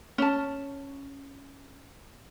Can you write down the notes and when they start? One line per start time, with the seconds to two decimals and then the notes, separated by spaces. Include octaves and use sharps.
0.18 C#4 A5